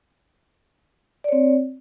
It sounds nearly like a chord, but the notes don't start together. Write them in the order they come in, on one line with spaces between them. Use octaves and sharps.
D5 C#5 C4